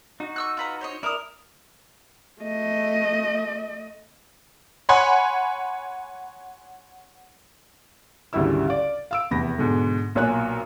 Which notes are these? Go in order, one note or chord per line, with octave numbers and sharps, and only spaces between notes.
D#4 F#4
C#6 E6 F#6
F4 B4 A#5
C5 C#5 D#5
E4 A#4 D5 D#6
A3 D#5
C#5 F#5 G#5 B5 C6
G#1 D2 C#3 G3 E4 E6
D5 F5
F5 E6 D7
F1 E2 B5 A#6
G#2 B2 D3
B1 A#2 C#5 G#5 F#6